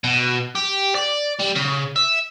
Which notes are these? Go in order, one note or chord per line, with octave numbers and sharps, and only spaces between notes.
B2
G4
D5
G3
C#3
E5